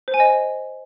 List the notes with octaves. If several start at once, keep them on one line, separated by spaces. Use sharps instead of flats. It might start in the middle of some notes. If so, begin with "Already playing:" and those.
C5
G#5
D#5